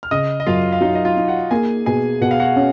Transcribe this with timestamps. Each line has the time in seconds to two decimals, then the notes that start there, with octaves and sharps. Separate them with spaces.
0.03 F6
0.11 C#3 D#5 D#6
0.40 D#5
0.47 F#2 F4 F5
0.72 F5
0.81 F#3 D#4 D#5
0.95 D#5
1.05 F4 F5
1.16 D#4
1.28 F#4 F#5
1.51 A#3 G#4 G#5
1.86 B2 G#4 G#5
2.21 B2 F#5
2.31 F5
2.40 F#4 F#5
2.56 C#4